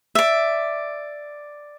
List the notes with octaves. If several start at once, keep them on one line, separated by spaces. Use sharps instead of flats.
D5 E5